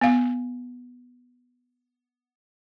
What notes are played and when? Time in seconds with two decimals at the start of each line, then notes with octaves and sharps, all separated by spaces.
0.01 B3 F5